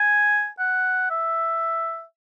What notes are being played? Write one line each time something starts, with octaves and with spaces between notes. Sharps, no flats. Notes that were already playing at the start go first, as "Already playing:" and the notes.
Already playing: G#5
F#5
E5